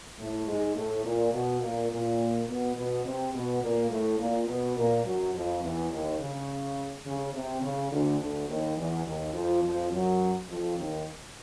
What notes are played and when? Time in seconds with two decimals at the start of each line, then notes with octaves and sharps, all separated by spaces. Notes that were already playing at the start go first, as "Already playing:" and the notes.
0.18 A2 A3
0.47 G#2 G#3
0.75 A2 A3
1.04 A#2 A#3
1.33 B2 B3
1.61 A#2 A#3
1.90 A#2 A#3
2.48 B2 B3
2.75 B2 B3
3.05 C3 C4
3.33 B2 B3
3.62 A#2 A#3
3.90 A2 A3
4.18 A#2 A#3
4.48 B2 B3
4.76 A#2 A#3
5.04 F#2 F#3
5.33 F2 F3
5.62 E2 E3
5.91 D#2 D#3
6.19 C#3
7.06 C#3
7.33 C3
7.62 C#3
7.91 D2 D3
8.20 D2 D3
8.48 D#2 D#3
8.76 E2 E3
9.05 D#2 D#3
9.33 F2 F3
9.62 F2 F3
9.91 F#2 F#3
10.48 F2 F3
10.77 D#2 D#3